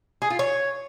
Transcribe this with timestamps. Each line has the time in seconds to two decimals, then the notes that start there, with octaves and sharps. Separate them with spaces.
0.22 G#4
0.30 F4
0.39 C#5